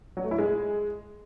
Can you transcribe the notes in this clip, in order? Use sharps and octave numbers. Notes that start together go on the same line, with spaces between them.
F#3
A3
E4
G#3